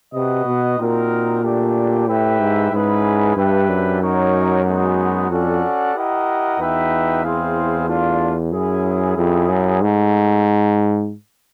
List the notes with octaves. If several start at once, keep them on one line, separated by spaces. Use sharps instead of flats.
C3 F#4 B4 D#5
B2
A#2 C4 D#4 F#4 A#4
A3 D4 G4
A2 E4 G4 B4 E5 G5
G#2
G#2 C#4 E4 G#4 B4
G2 D4 G4 B4 E5 G5
F#2
D#4 F#4 A#4 C#5
G#3 B3 D#4 F#4
F2 C#4 F#4 A4 D5 F#5
E4 G4 A#4 D#5 F#5
E2 D#4 F#4 B4 E5 G5
C4 E4 G#4 C5 F5
A3 D4 F4
F#2 C#4 E4 G#4
F2 C#4 E4 G#4
F#2
G#2 A3